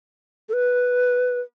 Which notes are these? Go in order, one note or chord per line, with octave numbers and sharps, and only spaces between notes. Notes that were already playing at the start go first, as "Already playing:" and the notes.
A4
B4